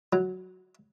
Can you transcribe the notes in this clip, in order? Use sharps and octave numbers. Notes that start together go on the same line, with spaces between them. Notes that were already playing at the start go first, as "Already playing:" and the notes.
F#3